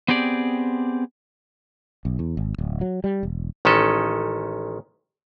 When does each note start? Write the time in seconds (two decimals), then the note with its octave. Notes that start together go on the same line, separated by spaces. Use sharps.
0.08 B3 C4 G4 G#4 D5
2.05 B1
2.19 E2
2.37 G#1
2.58 D1
2.81 F#3
3.04 G3
3.23 E1
3.65 A1 D#3 G#3 C#4 A4